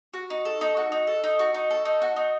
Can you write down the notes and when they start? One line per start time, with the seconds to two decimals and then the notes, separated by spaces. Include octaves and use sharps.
0.14 F#4
0.30 D#4
0.45 A4
0.61 D#4
0.77 F#4
0.92 D#4
1.07 A4
1.24 D#4
1.39 F#4
1.54 D#4
1.70 A4
1.85 D#4
2.02 F#4
2.16 D#4